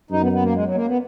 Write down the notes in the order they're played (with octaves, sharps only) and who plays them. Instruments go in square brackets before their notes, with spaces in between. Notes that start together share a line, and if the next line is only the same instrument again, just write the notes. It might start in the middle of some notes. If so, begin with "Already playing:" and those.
[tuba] F#2 [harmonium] D#4
[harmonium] B3
B3
A#3
G#3
F#3
A#3
B3